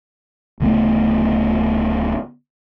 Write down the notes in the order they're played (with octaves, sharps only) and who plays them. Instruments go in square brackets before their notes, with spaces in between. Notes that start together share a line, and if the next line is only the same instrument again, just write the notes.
[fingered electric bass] D1 C#3 A3 B3